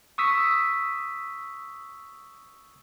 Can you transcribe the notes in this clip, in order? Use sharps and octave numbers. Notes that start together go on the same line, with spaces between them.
C#6 D#6 E6 B6